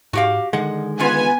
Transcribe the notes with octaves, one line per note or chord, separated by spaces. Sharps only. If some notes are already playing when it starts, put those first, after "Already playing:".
G#2 F#4 G4 F5
D3 D#3 G#3 F#5
B3 C#4 F4 G#5